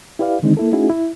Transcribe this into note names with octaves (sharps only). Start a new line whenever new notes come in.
E4 G4 B4 D5 F5
D3 D#3 G#3 C4 D4 D#4
A#3 E4 A4
A3 C#4 D#4 E4 F#4 G#4
E4